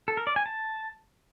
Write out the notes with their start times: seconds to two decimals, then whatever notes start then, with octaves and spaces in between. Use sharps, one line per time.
0.08 A4
0.17 A#4
0.27 D5
0.36 G#5
0.46 A5